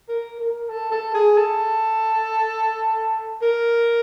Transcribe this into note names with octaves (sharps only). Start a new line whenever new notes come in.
A#4
A#4
A4
A4
G#4
A4
A#4